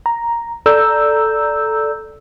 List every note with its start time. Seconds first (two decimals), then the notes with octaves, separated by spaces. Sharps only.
0.06 A#5
0.66 A4 D5 A#5 E6 G6